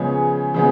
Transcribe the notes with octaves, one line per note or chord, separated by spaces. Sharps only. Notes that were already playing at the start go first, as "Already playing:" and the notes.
Already playing: C#3 F3 G#3 B3 C#5
C#3 F3 G#3 B3